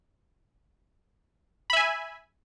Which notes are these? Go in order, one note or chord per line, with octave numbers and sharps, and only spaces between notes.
E5 G#5 B5